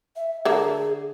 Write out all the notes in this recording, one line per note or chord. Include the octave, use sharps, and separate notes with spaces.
E5
D3 G#4 A#4 E5